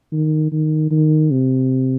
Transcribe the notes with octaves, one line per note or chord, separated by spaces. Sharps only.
D#3
D#3
D#3
C3